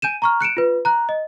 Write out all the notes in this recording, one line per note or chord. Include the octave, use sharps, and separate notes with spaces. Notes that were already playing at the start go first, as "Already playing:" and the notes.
G#5 G6 D#7 E7
A#5 C#6 F6
F#6 C#7 D7 E7
F4 B4
A#5 F#6
D#5